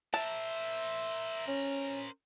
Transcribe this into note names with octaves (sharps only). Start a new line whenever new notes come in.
A#4 C5 E5 A5
C#4